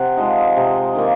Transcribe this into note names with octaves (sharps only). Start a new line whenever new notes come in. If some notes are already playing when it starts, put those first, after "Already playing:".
Already playing: C3 C4 F#5
F3 G#3 D#4
C3
D#3 A#3